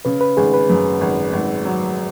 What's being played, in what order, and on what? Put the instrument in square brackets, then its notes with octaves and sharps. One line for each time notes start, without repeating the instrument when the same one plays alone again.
[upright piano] C#3 [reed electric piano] B4
[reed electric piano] B4
[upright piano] G#1 [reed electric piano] G#4
[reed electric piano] B4
[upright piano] F#2
G#1
G#1
F#3